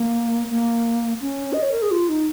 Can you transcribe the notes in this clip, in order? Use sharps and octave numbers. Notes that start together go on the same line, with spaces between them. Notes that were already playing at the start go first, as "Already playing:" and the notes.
Already playing: A#3
A#3
C#4
D#5
C#5
A#4
G#4
F4
D#4